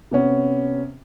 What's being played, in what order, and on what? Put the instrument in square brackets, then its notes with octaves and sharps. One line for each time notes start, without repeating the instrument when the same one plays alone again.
[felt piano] C3 B3 C#4